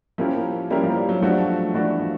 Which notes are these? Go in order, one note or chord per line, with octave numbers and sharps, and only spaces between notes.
F3 A#3 C#4 E4 G4 A#4
G3 A#3 C#4 E4 G4 A#4
F3
G3
F#3
F3 A3 D4 F#4
E3 A3 D4 F#4
F3